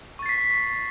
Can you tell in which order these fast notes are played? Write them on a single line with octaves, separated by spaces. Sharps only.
C#6 A6 C7 B6